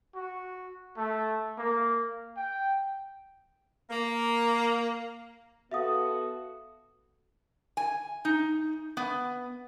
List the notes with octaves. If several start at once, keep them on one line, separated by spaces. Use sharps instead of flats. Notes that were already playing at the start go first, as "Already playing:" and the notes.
F#4
A3
A#3
G5
A#3
B3 F#4 A4 E5 F5 D#6
G#5
D#4
B3